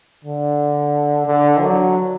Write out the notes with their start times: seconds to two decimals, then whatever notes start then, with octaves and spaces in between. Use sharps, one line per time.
0.25 D3
1.26 D3
1.61 F#3